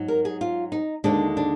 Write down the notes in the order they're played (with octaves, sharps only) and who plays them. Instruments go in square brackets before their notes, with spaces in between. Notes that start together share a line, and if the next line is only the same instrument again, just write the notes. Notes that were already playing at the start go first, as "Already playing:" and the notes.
Already playing: [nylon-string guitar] G#2 F#3
A#4
G#4
F4
D#4
D#2 D3 G#3 D4
D4